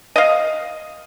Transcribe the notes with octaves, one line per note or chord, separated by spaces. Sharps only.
D#5 F5